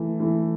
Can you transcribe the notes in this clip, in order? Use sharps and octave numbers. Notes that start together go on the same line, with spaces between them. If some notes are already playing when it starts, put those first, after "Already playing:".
Already playing: E3 A3 E4
E3 A3 E4